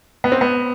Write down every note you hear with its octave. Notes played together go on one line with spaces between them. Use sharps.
B3
C4
B3